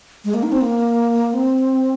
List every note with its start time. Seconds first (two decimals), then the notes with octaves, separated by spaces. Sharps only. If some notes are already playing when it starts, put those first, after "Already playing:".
0.25 G#3
0.34 A#3
0.43 D#4
0.52 C4
0.61 A#3
1.34 C4